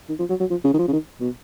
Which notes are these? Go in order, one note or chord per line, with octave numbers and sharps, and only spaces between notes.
D#3
F3
F#3
F#3
F3
C#3
D#3
F3
C#3
D#3
B2